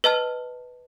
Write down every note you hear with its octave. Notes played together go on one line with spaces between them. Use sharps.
B4 D#5 A5 F6